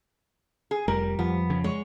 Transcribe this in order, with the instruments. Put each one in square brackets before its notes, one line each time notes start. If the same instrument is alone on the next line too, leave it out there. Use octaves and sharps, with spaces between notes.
[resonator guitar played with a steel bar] G#4
[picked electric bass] F1 [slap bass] G3 [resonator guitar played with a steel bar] A#4
[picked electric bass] F2 F3 [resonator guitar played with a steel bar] B3
[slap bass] C#3
[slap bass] G#3 [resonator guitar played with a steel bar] C#5